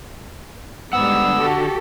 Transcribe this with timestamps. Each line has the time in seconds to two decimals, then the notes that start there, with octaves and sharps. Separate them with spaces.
0.93 G#2 D3 G3 B3 F#5 E6
1.38 F#4 G4 A4